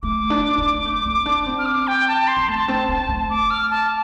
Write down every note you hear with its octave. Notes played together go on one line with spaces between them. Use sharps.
A3 D6
D4
C4
A3
C4
D4
C4
F6
D6
G5
A5
C6
C4
A3 A5
C4
C4 A5
A3
D6
F6
A5